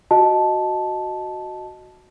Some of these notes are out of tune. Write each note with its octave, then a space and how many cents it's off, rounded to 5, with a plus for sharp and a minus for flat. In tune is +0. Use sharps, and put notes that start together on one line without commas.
F#4 +0 D#5 +0 A5 -10